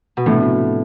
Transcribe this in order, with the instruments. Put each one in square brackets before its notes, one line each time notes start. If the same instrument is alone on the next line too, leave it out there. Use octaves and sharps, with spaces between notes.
[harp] B2
[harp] A2 [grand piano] C3 F3 B3 D4